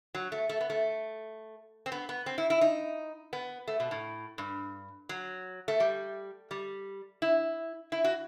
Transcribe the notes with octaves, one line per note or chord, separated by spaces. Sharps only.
F#3
A3
A3
B3
A3
C4
B3
B3
C4
E4
E4
D#4
B3
A3
B2
A2
G2
F#3
A3
G3
G3
E4
E4
F#4